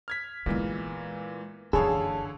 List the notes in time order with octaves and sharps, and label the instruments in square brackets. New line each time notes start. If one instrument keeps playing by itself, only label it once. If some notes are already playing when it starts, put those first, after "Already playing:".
[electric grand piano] F6 G#6 B6
[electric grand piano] A#2 E3 [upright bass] G#3 B3
[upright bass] F#1 E3 [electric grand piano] D3 C#5 F5 [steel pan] G#4 [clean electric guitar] A4